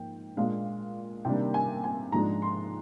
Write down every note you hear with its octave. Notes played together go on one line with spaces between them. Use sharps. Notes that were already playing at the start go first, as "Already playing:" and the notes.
Already playing: G#2 F3 A#3 G5
A#2 G#3 D4 F5
C3 D#3 G3 A#3 D4 G5
G#5
G#5
G#2 F3 G#3 D4 A#5
C6